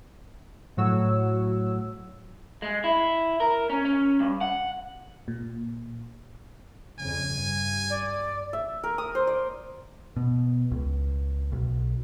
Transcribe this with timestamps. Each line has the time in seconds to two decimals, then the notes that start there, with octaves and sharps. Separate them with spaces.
0.77 A2 F#3 F#4 C#5 E6
2.62 G#3
2.84 E4
3.40 A#4
3.70 C#4
3.85 C#4
4.20 G2
4.41 F#5
5.28 A#2
6.99 F2 C#3 G#5
7.30 G2
7.90 D5
8.53 E5
8.83 A#4
8.98 D#6
9.15 C5
9.27 D5
10.16 B2
10.71 C#2
11.52 B1